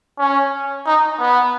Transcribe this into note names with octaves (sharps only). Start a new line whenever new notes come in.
C#4
D#4
B3